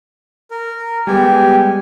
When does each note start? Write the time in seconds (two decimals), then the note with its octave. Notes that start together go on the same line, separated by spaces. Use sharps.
0.51 A#4
1.07 G3 G#3 B3 G4 G#5